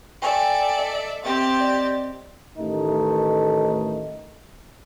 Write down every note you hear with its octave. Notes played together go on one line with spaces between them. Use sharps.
A4 D5 E5 G5 G#5
D#5
C4 G4 E5 G5 A6
D5 D#5
A1 D#3 A3 D#4